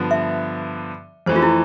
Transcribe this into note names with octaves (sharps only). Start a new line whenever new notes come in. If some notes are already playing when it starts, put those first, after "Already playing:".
Already playing: G2 D3 F3 B3
E5
F2 E3 A3 C5
F4
E4